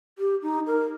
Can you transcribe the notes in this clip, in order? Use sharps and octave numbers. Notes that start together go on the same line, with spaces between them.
G4
D#4
A#4